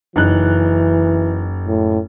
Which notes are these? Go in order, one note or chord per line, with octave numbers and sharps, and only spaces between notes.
F#1 E3 D#4 F#6
A2